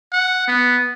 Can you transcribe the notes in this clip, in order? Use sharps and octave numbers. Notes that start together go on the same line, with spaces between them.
F#5
B3